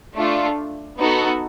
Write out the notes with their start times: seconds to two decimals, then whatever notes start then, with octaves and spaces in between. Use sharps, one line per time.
0.17 A3 D4 F4
0.99 B3 D#4 F#4 A4